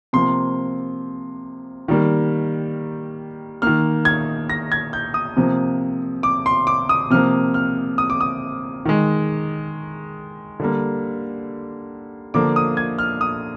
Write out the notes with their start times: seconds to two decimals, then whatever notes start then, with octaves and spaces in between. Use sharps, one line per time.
0.13 C3 F3 A#3 C6
1.88 D#3 G3 A#3
3.62 D#3 A#3 F6
4.05 G#6
4.50 A#6
4.72 G#6
4.93 G6
5.14 D#6
5.37 C3 F3 A#3
6.23 D6
6.46 C6
6.67 D6
6.89 D#6
7.11 C3 F3 A#3 F6
7.54 F6
7.98 D#6
8.10 D6
8.21 D#6
8.85 D#3 G#3
10.60 D3 G3 A#3
12.34 D3 F3 A#3 D6
12.56 D#6
12.77 G#6
12.99 F6
13.21 D#6